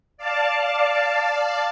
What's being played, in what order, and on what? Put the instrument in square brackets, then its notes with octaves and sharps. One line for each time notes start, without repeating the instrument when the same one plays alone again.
[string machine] D5 F5 A5